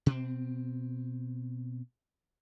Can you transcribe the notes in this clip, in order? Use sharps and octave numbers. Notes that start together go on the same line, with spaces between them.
B2 C4